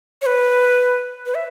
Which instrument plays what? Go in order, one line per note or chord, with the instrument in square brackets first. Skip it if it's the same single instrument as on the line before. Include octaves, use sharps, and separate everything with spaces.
[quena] C#5
B4
B4
E5